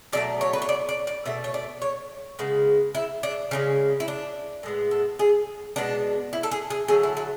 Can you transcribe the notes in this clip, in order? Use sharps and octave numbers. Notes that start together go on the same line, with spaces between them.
B2 F#3 A3 D5
C#5
B4
C#5
D5
D5
D5
B2 A3 E5
C#5
D5
C#5
C#3 G#3 B3
E4
D4
C#3 E3 G#3 C#4
E4
D4
A2 G#3 B3
A4
G#4
B2 G#3 B3 D4
E4
A4
G#4
G#4
D3 F#3 A3 G#4
E4
E4